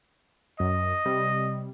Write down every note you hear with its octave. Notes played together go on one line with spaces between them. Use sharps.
F#2 D#5
C3 G3